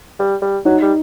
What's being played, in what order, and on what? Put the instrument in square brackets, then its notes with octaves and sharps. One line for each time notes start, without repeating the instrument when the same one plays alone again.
[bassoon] G3
G3
[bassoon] F#3 [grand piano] D#4
[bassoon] G3